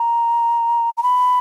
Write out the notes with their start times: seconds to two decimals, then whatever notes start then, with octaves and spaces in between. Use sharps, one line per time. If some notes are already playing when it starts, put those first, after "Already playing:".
Already playing: A#5
0.97 A#5
1.03 B5